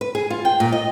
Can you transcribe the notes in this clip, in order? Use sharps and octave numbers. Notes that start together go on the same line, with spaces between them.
B4
G#4
F4
G5
A#2
D#5